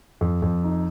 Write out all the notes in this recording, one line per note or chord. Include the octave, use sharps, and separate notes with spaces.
F2
F2
D#4